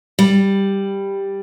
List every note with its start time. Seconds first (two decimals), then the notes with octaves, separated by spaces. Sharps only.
0.19 G3